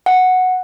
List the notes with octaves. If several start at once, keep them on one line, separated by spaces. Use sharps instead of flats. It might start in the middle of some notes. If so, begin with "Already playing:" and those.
F#5